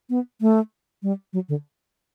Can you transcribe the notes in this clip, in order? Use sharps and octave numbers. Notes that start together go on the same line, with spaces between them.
B3
A3
G3
F#3
D3